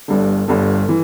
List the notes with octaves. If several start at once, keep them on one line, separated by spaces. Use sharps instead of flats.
G1 G2 D3
G1 G2 D3
E3